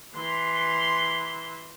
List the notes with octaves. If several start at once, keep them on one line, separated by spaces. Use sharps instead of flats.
E3 C6